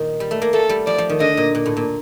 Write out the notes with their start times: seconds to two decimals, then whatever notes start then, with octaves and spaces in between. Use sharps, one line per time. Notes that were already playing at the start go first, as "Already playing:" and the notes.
Already playing: A#2 D#3
0.20 G3
0.31 A3
0.42 A#3
0.53 A3 A4
0.69 G3
0.86 F3 D5
0.98 F3
1.09 D#3
1.20 D3 D#5
1.37 A#2
1.55 A#2
1.66 A2
1.77 A#2